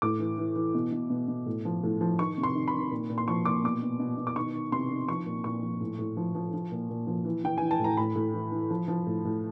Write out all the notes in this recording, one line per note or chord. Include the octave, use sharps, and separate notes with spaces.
A2 D6
E3
E3
E3
B2
B2
B2
B2
A2
F3
A2
F3
D#3 C#6
C3
C6
D#3
B5
D#3
A#2
A#2
C6
F3 C#6
A#2 D6
B2 D6
B2
B2
B2
D6
D#3 C#6
D#3
C3 C6
D#3
F3 C#6
A#2
A#2 C#6
F3
A2
A2
F3
F3
F3
A#2
A#2
F3
E3
E3 G5
E3 G#5
A5
A2 A#5
A2 B5
A2
E3
E3
F3
F3
A2
A2